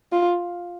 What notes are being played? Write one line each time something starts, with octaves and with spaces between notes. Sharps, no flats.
F4